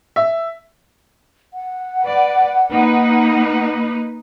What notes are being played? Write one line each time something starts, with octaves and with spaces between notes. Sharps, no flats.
E5
F#5
B4 D5
A#3 D#4 B4